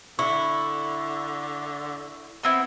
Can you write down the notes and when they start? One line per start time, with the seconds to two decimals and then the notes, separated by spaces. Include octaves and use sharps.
0.19 D3 E4 C#6
2.43 B3 C4 E4